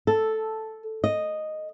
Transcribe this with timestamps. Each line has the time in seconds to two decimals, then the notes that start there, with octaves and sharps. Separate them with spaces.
0.07 A4
1.04 D#5